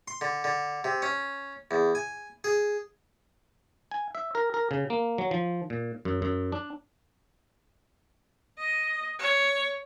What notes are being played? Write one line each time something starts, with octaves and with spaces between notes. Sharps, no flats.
C6
D3
D3
C3
C#4
E2
G#5
G#4
G#5
E5
A#4
A#4
C#3
A#3
F#3
F3
A#2
F#2
F#2
D4
D#5
C#5